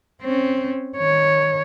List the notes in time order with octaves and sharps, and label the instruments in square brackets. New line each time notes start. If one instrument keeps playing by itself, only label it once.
[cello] C4 C#4
D#3 C#5